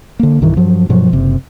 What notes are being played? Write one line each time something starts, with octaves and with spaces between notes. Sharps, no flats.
D3 A#3
C2 G2 D#3 E3
G2 F3 F#3
G2 B2 F3 F#3
F#1 C3